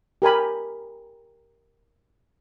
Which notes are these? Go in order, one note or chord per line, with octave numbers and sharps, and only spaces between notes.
G4 A#4 G#5 B5